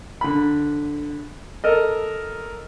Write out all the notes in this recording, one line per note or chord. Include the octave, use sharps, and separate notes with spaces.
D3 B5
A4 A#4 D#5